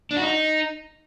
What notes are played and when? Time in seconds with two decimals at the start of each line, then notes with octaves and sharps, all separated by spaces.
0.11 D4
0.16 F#4
0.22 D#4